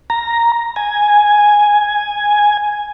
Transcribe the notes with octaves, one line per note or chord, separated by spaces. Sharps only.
A#5
G#5